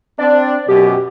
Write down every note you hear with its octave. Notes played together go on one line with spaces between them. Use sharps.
C4 D4 D5
F#2 B2 G4